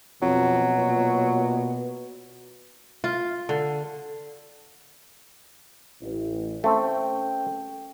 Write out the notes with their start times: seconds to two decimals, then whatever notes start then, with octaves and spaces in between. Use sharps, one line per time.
0.22 F2 B2 F#3
0.78 A#2
3.04 F4
3.49 D3
6.01 A1
6.64 A3 C4 C#4 G5